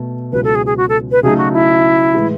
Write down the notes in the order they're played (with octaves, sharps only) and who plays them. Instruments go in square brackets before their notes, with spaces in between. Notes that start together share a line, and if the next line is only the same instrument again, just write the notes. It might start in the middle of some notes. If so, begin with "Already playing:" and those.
Already playing: [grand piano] B2 A3
[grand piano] C#2 B2 F#3 C#4 E4 [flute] B4
[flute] A4
G#4
G#4
F#4
A4
B4
[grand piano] C#3 F#3 A3 D#4 [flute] G#4
[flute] F#4
E4
[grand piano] A2 E3 G#3